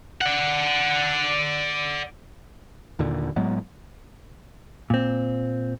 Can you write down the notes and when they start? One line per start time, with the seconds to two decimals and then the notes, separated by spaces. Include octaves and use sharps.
0.21 D5 F#5
2.99 D#2 A#2 D3
3.36 A2 F#3 G#3 B3
4.90 A#2 C4